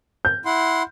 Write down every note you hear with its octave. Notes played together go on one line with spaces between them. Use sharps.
G6
E4 F#5 C6